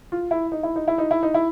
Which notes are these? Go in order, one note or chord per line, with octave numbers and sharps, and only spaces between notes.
F4
E4
D#4
E4
D#4
E4
D#4
E4
D#4
E4